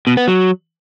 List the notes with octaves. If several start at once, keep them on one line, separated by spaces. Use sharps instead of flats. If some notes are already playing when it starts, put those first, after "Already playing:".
B2
B3
F#3